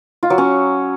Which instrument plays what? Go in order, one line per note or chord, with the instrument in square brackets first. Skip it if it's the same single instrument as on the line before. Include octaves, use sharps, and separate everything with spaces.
[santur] F4
F#3
C#4